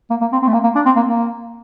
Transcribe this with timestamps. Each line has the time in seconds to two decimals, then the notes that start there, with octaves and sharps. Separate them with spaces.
0.10 A#3
0.21 A#3
0.32 C4
0.42 C4
0.48 A3
0.53 A#3
0.63 A#3
0.75 D4
0.85 C4
0.96 A#3
1.07 A#3